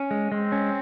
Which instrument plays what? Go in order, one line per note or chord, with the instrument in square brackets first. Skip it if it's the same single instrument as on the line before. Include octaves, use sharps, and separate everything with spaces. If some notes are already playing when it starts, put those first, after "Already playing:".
Already playing: [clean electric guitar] C#4
G#3
[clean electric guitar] G#3 [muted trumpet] C4
[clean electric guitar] C#4